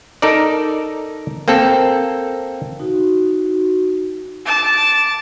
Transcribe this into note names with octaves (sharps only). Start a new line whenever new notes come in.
D#4 A4 A#4 D5
A#3 C4 A4
D#4 F#4
A5 D6